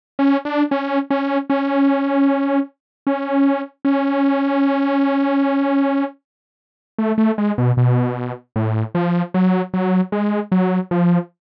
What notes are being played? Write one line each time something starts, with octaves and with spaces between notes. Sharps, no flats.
C#4
D4
C#4
C#4
C#4
C#4
C#4
A3
A3
G#3
B2
B2
A2
F3
F#3
F#3
G#3
F#3
F3